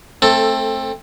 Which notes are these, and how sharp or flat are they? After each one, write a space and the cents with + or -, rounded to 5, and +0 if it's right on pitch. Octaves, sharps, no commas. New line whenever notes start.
A3 +0 C4 +20 A4 +15